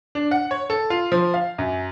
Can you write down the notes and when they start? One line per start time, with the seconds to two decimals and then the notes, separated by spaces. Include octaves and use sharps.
0.15 D4
0.31 F#5
0.51 C#5
0.70 A4
0.90 F4
1.12 F3
1.34 F5
1.58 F#2